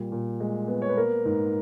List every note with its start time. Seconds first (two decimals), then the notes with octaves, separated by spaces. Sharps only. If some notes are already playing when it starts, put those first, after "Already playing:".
Already playing: A#2 G3
0.12 A#2
0.40 G#3
0.68 B3
0.82 C#5
0.89 B4
0.97 A#3 A#4
1.25 G#2